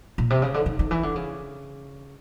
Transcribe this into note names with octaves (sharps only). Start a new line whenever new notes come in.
A#2
C3
C#3
D3
D#3
D#3
E3
D3
C#3